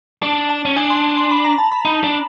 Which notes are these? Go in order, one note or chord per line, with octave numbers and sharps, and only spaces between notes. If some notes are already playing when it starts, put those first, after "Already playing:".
D4 A5
A5
C#4
D4 G#5
C6
C6
B5
A#5
A5
B5
D#4
D4